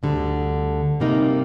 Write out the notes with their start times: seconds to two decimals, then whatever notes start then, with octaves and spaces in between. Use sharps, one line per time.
0.03 D2 D3 G3
1.00 C3 G3 A#3 D#4